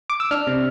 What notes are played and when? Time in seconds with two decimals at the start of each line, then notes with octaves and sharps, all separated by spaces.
0.10 D6
0.20 E6
0.31 D4 F6
0.47 C3